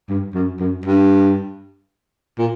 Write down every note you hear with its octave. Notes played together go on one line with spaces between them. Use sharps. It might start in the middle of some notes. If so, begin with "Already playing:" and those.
G2
F#2
F#2
G2
A#2